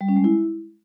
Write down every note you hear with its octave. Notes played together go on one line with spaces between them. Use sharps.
G3
C#4
G#3
E4